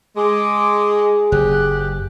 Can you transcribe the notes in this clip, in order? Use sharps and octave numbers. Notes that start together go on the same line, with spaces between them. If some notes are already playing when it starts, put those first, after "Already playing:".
G#3 G#4 D6
F#1 G4 F#6